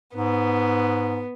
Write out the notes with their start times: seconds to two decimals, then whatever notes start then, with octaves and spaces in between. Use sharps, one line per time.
0.15 G#2 B3